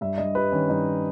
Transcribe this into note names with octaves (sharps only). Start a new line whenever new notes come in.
G2 E5
G2 D#5
G3 B4
D#3 C#4
G2 D#4